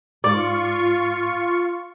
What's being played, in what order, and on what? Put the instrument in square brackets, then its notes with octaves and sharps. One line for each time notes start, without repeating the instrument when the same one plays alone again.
[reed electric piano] G#2 [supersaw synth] F4 C#6 [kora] D5 [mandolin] D6